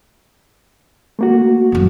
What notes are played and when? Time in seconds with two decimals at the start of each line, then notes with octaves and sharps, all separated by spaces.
1.19 A3 A#3 F#4
1.72 E1 F#2